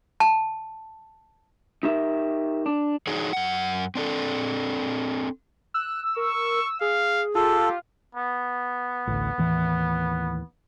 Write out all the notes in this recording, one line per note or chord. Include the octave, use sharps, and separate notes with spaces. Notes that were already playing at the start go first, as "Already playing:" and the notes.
A5
D#4 G4 A#4 E5
D4
D4 D#4 F#4 G#4 C#5
F#2 F#5
C4 D4 A4
E6 F#6
A#4 C#6
G#4 F5
F4 G4 A4
B3
A1 D2
D#2 A2 E3